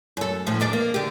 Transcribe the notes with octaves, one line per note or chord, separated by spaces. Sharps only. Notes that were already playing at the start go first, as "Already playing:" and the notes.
F#2 A4
A2 F3
E2 D4 D5
A#3
D3 G4